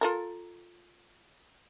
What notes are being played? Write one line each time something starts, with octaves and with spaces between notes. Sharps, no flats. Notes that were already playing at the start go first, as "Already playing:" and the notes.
F4 A4 A#4